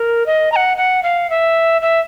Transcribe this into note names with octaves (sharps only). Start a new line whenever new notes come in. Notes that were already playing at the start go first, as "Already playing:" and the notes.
Already playing: A#4
D#5
A#5
F#5
F#5
F5
E5
E5